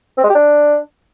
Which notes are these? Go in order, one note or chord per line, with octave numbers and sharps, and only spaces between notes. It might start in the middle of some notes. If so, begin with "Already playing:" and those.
C4
G#3
G4
D4